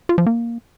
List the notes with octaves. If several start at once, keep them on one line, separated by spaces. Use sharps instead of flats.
F4
F3
A#3